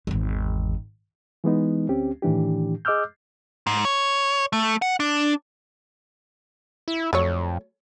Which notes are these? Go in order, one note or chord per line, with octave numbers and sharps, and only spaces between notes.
G#1 E2
E3 G#3 B3 D#4
D2 C4 C#4 G4
A2 D#3 E3 D4 G4
G#4 D#5 D6 E6 F6 G6
G#2
C#5
A3
F#5
D4
E4
F2 F#3 A3 C#5